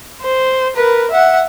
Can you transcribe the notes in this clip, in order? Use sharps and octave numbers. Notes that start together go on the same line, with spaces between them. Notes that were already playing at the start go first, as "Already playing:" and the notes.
C5
A#4 B4
E5 F#5